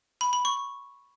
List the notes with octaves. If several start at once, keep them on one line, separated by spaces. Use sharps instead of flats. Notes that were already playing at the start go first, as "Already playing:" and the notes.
B5
B5
C#6